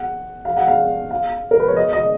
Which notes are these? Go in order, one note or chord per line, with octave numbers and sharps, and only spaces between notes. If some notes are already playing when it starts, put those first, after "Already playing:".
Already playing: F#5
F5
F#5
F5
F5
A#4
B4
C#5
D#5
D#5